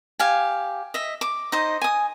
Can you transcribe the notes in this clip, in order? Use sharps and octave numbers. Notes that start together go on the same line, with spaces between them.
G4 F5 G#5
D#5 E5
D6
D#4 C5 D#5
G#5 D#6